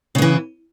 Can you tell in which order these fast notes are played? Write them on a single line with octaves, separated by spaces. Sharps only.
C#3 B3 E3